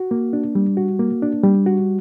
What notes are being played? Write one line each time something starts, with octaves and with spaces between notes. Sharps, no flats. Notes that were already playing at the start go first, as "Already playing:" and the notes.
Already playing: F#4
A#3
D4
G3
F#4
A#3
D4
G3
F#4